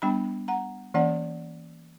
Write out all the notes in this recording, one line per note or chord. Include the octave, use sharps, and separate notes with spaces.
G3 B3 D4 G5 B5
F#5 A#5
E3 A#3 C#4 D5 F#5